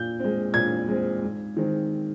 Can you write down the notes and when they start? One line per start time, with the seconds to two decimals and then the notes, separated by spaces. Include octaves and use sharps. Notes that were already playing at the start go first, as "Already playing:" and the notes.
Already playing: A#2 G6
0.20 G#3 C4
0.54 A#2 G#6
0.88 G#3 C4
1.22 G#2
1.57 D#3 G#3 C4